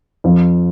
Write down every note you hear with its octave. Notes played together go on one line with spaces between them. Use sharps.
F2 F3